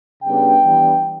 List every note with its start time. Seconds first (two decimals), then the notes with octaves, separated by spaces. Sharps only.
0.23 C#3 G3 B3 D4 G5
0.63 E3 G3 B3 D4